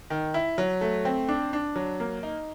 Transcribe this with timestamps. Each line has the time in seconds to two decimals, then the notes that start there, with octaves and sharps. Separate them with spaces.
0.10 D#3
0.34 E4
0.58 F#3
0.81 A3
1.05 C4
1.28 D4
1.53 D4
1.76 F#3
2.00 A#3
2.23 D#4